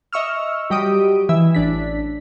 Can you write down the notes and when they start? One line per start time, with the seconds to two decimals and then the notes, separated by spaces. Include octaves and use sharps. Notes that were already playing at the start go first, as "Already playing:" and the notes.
0.13 D#5 E5 C#6 E6 F6
0.70 F#3 G3 G4 D#5 D#6 D7
1.29 E3 E5
1.55 A1 D4 B6